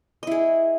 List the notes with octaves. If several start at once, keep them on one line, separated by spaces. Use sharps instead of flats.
E4 G#4 D#5